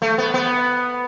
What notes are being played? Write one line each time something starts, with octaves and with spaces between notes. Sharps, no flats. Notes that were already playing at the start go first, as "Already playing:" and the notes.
A3
B3
B3